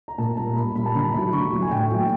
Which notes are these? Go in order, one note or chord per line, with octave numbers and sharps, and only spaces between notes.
A#5
A#2 A5
G3 A#3 A#5
A#2 B5
G3 A#3 B5
A5
D3 A#5
F#3 A3 B5
D3 C#6
F#3 A3
G#5
A2 G5
F#3 A3